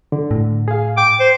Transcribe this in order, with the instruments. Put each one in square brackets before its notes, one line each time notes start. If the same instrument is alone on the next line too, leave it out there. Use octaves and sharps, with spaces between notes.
[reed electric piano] D3
[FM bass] A2
[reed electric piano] G#4 F5
[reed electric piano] G5 [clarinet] D6
[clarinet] C5